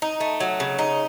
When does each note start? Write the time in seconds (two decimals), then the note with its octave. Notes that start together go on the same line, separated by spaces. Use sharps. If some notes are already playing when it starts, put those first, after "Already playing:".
0.02 D#4
0.20 A3
0.40 F#3
0.60 C#3
0.79 D#4